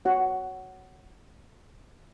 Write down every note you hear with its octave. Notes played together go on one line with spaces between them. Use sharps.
F#4 C#5 F#5